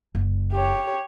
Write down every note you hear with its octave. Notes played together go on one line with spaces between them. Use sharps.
F#1
G4 C#5